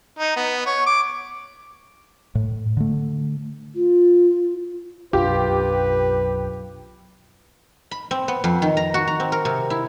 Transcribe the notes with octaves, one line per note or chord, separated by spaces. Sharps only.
D#4
B3
C#5
D6
A2
D3 A3
F4
B1 F#2 D4 F4 G4 B4
B5
C4
B3
F2
D#3
A#5
F#4
A#5
C4
A#4
C3
E4